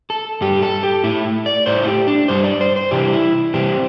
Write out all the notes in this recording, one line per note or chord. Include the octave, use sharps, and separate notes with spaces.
A4
G2 G3 G4
A4
G4
A2 A3 E4
D5
A2 A3 C5
E4
G4
D4
G2 G3 C5
D5
C5
C5
C3 E3 G3 G4
E4
C3 E3 G3 C4